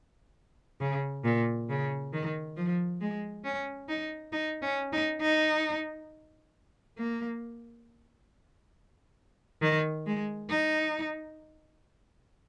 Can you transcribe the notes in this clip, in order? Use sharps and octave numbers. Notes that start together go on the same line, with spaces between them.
C#3
A#2
C#3
D#3
F3
G#3
C#4
D#4
D#4
C#4
D#4
D#4
A#3
D#3
G#3
D#4